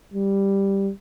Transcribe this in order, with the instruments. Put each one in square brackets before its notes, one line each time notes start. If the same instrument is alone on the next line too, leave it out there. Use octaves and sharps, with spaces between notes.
[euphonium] G3